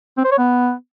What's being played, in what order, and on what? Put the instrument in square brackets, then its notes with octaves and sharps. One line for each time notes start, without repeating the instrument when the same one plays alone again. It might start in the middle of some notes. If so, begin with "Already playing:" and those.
[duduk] C4
C5
C#5
B3